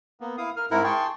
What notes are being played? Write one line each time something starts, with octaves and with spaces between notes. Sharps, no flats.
A#3 B3
E4 F5 D#6
A#4 F6
G#2 C4 E4 A#4 F#5 F#6
G#4 G5 A5 C6 C#6